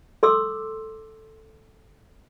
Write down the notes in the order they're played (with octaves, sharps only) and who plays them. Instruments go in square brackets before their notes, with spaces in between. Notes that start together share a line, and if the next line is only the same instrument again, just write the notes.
[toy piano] A4 C6 D6 E6